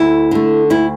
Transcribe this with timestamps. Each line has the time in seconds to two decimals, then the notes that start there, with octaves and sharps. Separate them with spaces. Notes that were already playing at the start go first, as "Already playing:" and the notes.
Already playing: D2 E4
0.31 D3 A3
0.70 D2 E4